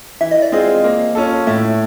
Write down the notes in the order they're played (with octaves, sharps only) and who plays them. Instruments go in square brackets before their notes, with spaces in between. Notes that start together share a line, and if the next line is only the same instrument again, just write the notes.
[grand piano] E3 [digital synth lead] E5
[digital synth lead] D#5
D5
[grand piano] G#3 C4 F4 G#4 [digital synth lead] D#5
[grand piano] A#3
C#4 F4 A4
[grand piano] A2 [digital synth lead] E5